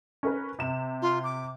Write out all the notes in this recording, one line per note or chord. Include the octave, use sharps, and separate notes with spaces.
C#4 A#4 B4
C3 E7
F4
D6